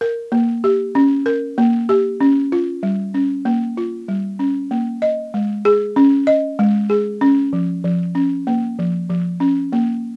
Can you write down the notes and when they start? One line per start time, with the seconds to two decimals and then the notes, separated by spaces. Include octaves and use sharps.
0.01 A#4
0.32 A#3
0.64 G4
0.95 C#4
1.26 A#4
1.58 A#3
1.89 G4
2.20 C#4
2.52 F4
2.83 G3
3.14 C#4
3.45 A#3
3.77 F4
4.08 G3
4.39 C#4
4.71 A#3
5.02 D#5
5.34 G#3
5.65 G#4
5.96 C#4
6.27 D#5
6.59 G#3
6.90 G#4
7.21 C#4
7.53 F3
7.84 F3
8.15 C#4
8.47 A#3
8.79 F3
9.10 F3
9.40 C#4
9.73 A#3